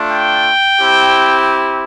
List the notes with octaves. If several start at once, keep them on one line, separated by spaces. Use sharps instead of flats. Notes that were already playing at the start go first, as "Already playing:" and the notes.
Already playing: A3 D4 F4
G5
C4 E4 G4